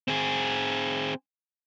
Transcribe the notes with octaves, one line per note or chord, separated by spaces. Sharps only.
C4 G#4